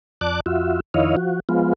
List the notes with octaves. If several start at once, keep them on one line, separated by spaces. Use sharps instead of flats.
F2 D5 A5 D6 F#6
F2 F4 F#4 E5
F2 D#3 E4 C#5 D#5 F5
F3 F#4
F3 G#3 B3 F4